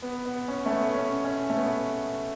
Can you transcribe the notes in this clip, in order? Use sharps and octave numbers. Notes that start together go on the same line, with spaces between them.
B3
B3
C#4
A3
B3
C#4
C#4
A3
B3